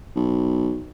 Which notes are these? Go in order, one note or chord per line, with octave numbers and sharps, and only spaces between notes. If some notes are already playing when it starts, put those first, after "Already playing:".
B1